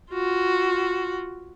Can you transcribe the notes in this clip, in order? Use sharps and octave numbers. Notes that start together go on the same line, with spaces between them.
F4 F#4